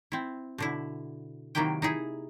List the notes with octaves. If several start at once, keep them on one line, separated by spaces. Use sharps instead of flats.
C4 E4
B2 D3 E4
C3 D#3 F#3 A#3 E4 G5
D#4 E4 G#4